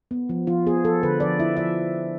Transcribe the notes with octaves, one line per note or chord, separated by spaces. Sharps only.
B3
F3
F3 F4
B3 G#4
F3 A4
D3 B4
F3 D5
E4 E5
F3 E5